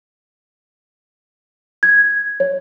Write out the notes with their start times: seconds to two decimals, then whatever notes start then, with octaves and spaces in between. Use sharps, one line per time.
1.83 G#6
2.40 C#5